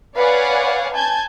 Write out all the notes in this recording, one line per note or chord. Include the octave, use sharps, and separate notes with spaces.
B4 C#5 D5 F5 F#5 G#5
G#5 A5 G6 G#6